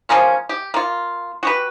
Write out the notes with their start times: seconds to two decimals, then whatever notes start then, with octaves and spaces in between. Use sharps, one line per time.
0.09 F3 G#3 A#3 C#4
0.49 G4
0.74 A#3 F4
1.43 F#4 G4 B4